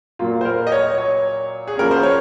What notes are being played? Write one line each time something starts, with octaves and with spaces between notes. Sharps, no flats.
A#2 F#3 A#3 F4
C5
A#4
D#5
C#5
C#5
G#4
F3 A#3 C#4 A#4
C5
C#5